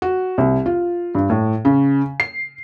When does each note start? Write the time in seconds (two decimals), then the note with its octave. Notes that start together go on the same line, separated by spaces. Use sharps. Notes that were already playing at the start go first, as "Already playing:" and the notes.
0.02 F#4
0.38 C2
0.66 F4
1.15 G2
1.30 A2
1.65 C#3
2.20 C7